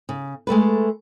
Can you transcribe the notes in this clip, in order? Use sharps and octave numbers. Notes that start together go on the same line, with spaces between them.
C#3
G#3 A3 A4 B4